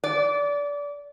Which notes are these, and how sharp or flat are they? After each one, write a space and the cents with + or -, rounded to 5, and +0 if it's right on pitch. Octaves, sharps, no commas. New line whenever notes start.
D5 -25